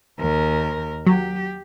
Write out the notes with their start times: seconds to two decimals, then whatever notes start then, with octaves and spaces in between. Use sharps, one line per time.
0.19 D#2 A#4
1.07 F#3 G4